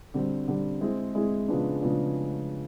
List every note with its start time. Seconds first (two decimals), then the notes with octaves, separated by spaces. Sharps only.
0.14 D3 G3 C4
0.48 D3 G3 C4
0.81 G#3 C4 E4 G#4
1.15 G#3 C4 E4 G#4
1.48 C#3 F3 G#3 B3 D4
1.81 C#3 F3 G#3 B3 D4